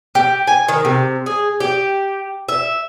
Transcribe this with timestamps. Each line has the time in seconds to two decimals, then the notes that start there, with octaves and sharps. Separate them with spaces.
0.15 G4
0.47 G#5
0.68 D#3
0.85 C3
1.26 G#4
1.60 G4
2.49 E5